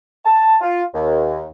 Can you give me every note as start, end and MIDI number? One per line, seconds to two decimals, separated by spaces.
0.25 0.56 81
0.61 0.82 65
0.94 1.48 39